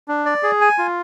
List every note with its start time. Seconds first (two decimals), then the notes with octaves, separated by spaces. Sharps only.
0.08 D4
0.25 D5
0.43 G#4
0.61 G#5
0.78 F4